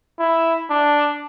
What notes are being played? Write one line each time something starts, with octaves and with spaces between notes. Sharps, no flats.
E4
D4